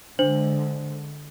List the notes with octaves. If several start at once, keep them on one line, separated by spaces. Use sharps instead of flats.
D3 G#3 D4 C5 F#7